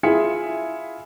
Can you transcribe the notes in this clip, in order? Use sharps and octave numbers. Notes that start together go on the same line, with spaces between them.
E4 F4 G#4 E5 C#7